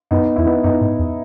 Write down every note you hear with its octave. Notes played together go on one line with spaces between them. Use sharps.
F#2 B3 D#4
E2 E4
B3 D#4
F#2 B3 D#4
G#2
E2